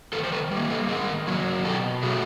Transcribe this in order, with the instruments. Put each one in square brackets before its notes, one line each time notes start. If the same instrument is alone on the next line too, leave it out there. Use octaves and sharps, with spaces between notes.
[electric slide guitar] D#3 A4 B4
C5
A4 B4
G3 A#3
A4 B4
D#3 G#4 A#4
F#3 A#3
B2 G4 A4
F#3 A3 F#4 G#4